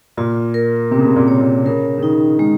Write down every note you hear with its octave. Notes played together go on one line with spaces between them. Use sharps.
A#2 F4
A#4
C3 C4
C#3
C3
A#2
C#5
A#2
C#3 A#4
C#3
D#3 D#4
D#3 G#3